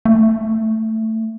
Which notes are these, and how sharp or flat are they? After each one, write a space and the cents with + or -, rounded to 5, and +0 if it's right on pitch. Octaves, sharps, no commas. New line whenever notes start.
A3 +10